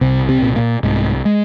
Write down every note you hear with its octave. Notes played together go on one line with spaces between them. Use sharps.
C2 C3 C4
C3 C4
A#2
A#2 A#3
C2 G#2 G#3
G#3